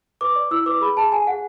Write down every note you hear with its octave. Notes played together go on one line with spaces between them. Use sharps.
B4 D6
D5
E4 E6
B4 D6
G#4 B5
G#4 A5
G#4 G#5
G#4 F#5